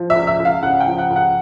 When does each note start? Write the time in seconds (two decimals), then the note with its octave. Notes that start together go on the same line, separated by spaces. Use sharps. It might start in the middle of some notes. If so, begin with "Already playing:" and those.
Already playing: F3
0.10 E5
0.15 C#2
0.27 E5
0.40 C#2
0.45 F5
0.63 C#3 F#5
0.80 G5
0.87 F3
0.98 F#5
1.10 C#2
1.16 F#5